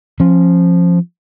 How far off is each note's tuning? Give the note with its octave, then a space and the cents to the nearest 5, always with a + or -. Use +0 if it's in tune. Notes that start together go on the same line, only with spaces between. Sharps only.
F3 +0 C#4 -30